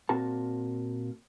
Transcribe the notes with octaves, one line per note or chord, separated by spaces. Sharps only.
A#2 C4 F#4 A#4 A5